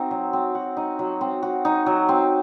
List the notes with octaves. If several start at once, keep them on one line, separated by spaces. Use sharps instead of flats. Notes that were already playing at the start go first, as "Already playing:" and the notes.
Already playing: C4 D#4 F#4
F#3
C4
F#4
D#4
F#3
C4
F#4
D#4
F#3
C4